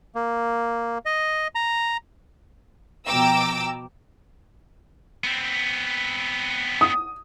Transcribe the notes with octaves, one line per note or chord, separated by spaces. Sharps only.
A#3
D#5
A#5
B2 F3 G5 A#5 D6 E6
B3 C4
D#6